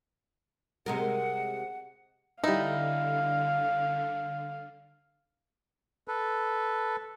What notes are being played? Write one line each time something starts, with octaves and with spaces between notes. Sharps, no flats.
C3 G#3 A#4 F#5
D3 G3 D#4 E4 F5
A4 B4